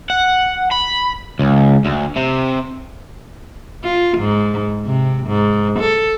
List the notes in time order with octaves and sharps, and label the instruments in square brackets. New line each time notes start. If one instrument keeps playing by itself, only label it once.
[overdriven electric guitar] F#5
B5
C#2
D2
C3
[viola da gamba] F4
G#2
C3
G#2
A4